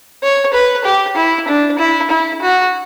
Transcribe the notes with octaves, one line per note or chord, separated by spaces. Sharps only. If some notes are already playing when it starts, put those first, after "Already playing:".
C#5
B4
G4
E4
D4
E4
E4
F#4